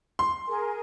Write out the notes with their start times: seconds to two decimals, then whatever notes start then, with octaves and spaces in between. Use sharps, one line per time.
0.19 C6
0.47 G#4 A#4 G#5